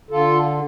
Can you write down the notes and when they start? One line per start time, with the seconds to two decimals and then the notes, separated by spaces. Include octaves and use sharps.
0.11 D3 F4 A4